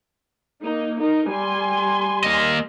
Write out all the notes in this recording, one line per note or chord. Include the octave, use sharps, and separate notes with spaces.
A#3 D#4
D#4 A#4
G3 G#5 C6
A#3 D#5